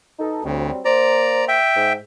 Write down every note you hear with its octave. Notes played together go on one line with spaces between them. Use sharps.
B2 D#4 A4
D2 F#3 G3 C4
A#3 C5 D5 A#5
E5 G5
G#2